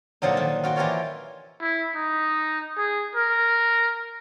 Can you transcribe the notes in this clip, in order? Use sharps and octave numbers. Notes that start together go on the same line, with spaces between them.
A#2 D3 F3 F#3 D#4
D#3
F4 F#4 G5
E3 F4 G4 A#4 C#5 D5
E4
D#4
G#4
A#4